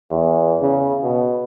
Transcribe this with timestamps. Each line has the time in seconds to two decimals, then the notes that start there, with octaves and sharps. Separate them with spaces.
0.11 E2
0.61 C#3
1.03 B2